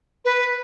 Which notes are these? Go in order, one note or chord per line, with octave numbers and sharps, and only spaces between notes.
B4